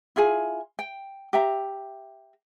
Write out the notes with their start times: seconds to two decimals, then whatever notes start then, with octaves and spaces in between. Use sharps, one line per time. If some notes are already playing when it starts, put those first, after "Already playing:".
0.16 E4 F4 G#4 G#5
0.79 G5
1.33 G4 E5 A#5